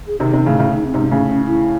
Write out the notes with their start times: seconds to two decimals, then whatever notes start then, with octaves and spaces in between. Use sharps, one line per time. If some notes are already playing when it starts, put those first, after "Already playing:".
0.06 G#4
0.20 C3 D#3 C4
0.32 C3 D#3 C#4
0.46 A2 C#3 C#4
0.53 D#3
0.59 A2 C#3 D#4
0.72 D#4
0.85 C4
0.94 G#2 C3 C#4
1.11 A2 C#3 C#4
1.28 C#4
1.46 E4